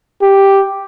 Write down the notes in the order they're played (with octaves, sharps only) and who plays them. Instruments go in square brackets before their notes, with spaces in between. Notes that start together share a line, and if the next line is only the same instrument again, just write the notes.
[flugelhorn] G4